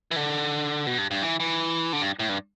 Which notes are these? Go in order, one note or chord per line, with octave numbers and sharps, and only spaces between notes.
E3
D3
B2
G2
G2
E3
E3
D3
G2
A2
G2